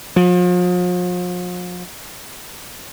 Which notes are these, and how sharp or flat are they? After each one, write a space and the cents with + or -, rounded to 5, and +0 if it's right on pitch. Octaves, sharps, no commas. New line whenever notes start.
F3 +40